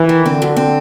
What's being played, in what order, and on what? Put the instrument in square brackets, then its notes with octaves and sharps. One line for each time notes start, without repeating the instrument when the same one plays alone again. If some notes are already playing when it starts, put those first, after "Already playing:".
Already playing: [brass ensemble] E3
[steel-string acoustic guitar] D#3
[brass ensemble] D3 [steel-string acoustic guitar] C4
[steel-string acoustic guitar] F#2
C4